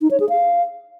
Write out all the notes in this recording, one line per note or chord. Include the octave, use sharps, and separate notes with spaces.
D#4
C#5
G#4
F5